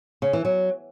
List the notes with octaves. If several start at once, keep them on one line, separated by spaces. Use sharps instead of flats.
C#3
E3
F#3